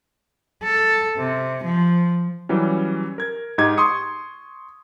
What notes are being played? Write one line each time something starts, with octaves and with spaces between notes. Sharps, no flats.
A4
C3
F3
E3 F#3 G3 C#4
A#4 G#6
G#2 D#4 G4 G#6
C6 C#6 D#6 C#7